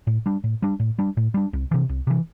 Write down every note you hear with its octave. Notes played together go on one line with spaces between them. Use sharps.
A2
G3 D4
A2
G3 D4
A2
G3 D4
A2
G3 D4
C2
C3 E3
C2
C3 E3